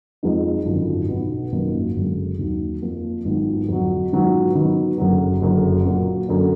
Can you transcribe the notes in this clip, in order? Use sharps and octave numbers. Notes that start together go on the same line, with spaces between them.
F2 F3 G#3 D#4
G#1 F#2 D3 F3
B1 B2 F#3 B3
G#1 F#2 F3 A#3 D#4
F#1 F#2 D3 G#3
D#2 D#3 F#3
F2 F3 A#3
G#1 G#2 F#3 B3 F4
F2 D3 F#3
G#2 D#3 F#3 B3 F4
D#3 F#3 B3
F#1 F#2 D3 F#3
F#1 F#2 D3
A#2 F#3 A#3
F#2 D3